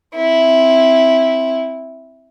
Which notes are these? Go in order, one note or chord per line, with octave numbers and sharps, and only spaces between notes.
C4 E4